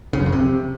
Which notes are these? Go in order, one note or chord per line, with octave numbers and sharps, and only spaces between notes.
C#3
F#2
F2
C3